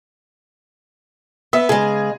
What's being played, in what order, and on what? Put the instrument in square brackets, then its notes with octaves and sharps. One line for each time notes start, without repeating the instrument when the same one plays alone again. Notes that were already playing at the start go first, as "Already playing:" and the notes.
[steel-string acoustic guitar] B3 [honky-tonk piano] E5
[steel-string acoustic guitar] C#3 G#3 [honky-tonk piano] G#4